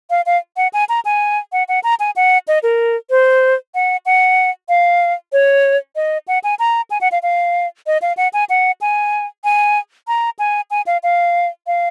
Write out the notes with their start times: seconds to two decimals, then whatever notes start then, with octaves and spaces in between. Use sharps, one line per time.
0.10 F5
0.26 F5
0.57 F#5
0.73 G#5
0.89 A#5
1.05 G#5
1.52 F#5
1.69 F#5
1.83 A#5
2.00 G#5
2.16 F#5
2.48 D#5
2.63 A#4
3.10 C5
3.75 F#5
4.06 F#5
4.69 F5
5.33 C#5
5.96 D#5
6.28 F#5
6.44 G#5
6.59 A#5
6.91 G#5
7.01 F#5
7.12 F5
7.23 F5
7.87 D#5
8.02 F5
8.17 F#5
8.33 G#5
8.49 F#5
8.81 G#5
9.44 G#5
10.08 A#5
10.39 G#5
10.71 G#5
10.86 F5
11.03 F5
11.67 F5